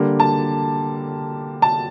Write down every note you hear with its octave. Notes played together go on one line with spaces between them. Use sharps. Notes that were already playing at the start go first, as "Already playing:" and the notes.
Already playing: D3 G3 A#3
A5
A5